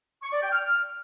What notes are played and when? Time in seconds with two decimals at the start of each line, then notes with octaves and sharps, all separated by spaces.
0.22 C#6
0.32 D5
0.42 G5
0.52 F6